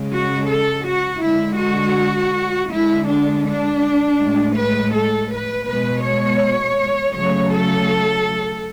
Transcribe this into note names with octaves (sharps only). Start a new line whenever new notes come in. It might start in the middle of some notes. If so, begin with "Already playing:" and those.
Already playing: C#3 G#3
F#4
A4
F#4
D3 G#3 E4
F#4
D3 G#3 E4
D4
D4
A2 G#3
B4
A4
B4
B2 G#3 B4
C#5
C#3 F#3 A3 C#5
A4